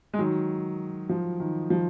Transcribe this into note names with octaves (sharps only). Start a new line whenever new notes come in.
G#3
D#3 F#3
F3
D#3
F3